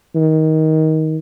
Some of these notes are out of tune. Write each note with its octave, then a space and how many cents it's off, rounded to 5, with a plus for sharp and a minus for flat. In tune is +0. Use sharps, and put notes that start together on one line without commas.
D#3 +20